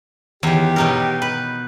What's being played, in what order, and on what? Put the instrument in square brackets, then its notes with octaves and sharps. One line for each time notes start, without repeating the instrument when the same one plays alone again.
[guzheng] E2 D#3 [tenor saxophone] G4
[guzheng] B2 D#4 A#4
B4